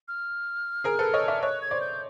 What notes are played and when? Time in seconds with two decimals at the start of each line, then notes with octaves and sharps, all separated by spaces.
0.08 F6
0.84 G#4 A#4
0.99 A4 B4
1.14 C#5 D#5
1.28 D5 E5
1.43 C#5 D#5 F#6
1.62 G#6
1.71 C5 D5
1.81 G6